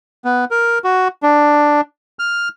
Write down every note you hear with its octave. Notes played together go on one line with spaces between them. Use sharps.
B3
A#4
F#4
D4
F6